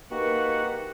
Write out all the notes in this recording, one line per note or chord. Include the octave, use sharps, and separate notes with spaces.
A#3 D#4 F#4 G4 B4 F#5